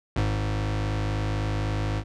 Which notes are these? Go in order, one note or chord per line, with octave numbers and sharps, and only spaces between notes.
G#1 G#2